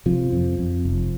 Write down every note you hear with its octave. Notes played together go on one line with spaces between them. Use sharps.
C3 F3
F2
F2
F1